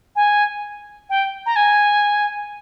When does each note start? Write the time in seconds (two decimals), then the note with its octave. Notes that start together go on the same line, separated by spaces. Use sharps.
0.16 G#5
1.10 G5
1.46 A#5
1.56 G#5